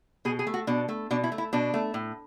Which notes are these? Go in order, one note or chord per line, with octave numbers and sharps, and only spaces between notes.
B2 G#4
G#4
A3
F#4
B2 D4
A3
B2 D4
E4
A3
E4
B2 D4
A3
A2